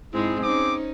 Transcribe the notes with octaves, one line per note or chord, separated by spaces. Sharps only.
G#2 G#3 C4 E4 G#4
C#4 D#4 C5 D6